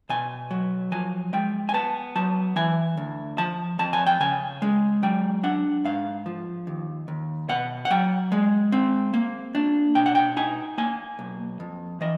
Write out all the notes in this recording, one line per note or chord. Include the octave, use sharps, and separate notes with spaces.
B2 G#5
F#3
F3 G#5
G#3 G5
G#5
B3 A5
F#3 A5
E3 G#5
D2
F3 A5
F2 A5
G#5
G5
C#3 G#5
G#3
F#3 G5
D4 F#5
G#2 F5
F3
D#2
D#2
B2 F#5
F#5
F#3 G5
G#3
C4
A#3
D4
B2 G5
F#5
G5
D#4 G#5
A#3 G#5
B1
F2
E3 D#5